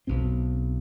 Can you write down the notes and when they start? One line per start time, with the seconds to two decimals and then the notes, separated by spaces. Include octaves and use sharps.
0.07 B1 B2 C4